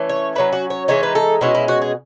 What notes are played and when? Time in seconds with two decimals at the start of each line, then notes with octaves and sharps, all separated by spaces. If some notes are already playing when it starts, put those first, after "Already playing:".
Already playing: E3 A3 C#4
0.09 C#5
0.35 F#3 C#4 E4 B4
0.52 F#4
0.70 C#5
0.88 E3 G#3 D#4 C#5
1.03 B4
1.15 A4
1.41 B2 G#3 C#4 E4 F#4
1.55 E4
1.68 F#4
1.82 G#4